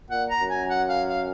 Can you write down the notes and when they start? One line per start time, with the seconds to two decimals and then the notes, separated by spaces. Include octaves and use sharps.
0.10 A#2 F#5
0.30 A#5
0.40 F#2
0.50 G#5
0.69 F#5
0.89 F5
1.08 F5